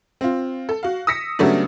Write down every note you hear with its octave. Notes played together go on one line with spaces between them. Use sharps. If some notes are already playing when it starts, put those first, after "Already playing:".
C4 F4
A4
F#4 F5
D#6 E6 A#6 B6 C#7
C#3 F#3 G3 A3 B3 D4